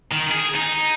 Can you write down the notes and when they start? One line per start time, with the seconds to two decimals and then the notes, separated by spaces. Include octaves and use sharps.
0.12 D#3
0.32 G#4
0.55 D#4